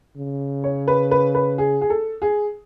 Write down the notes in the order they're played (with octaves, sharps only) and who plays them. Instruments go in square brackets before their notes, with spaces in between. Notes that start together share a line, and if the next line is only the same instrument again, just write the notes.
[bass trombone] C#3
[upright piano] C#5
B4
B4
B4
G#4
G#4
A4
G#4